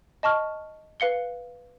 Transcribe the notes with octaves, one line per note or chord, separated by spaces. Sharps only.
D#5 A5 C#6 F6
B4 F5 C#7 G7